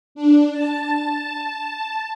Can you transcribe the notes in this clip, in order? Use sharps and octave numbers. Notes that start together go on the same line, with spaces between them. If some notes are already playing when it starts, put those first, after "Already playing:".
D4
A5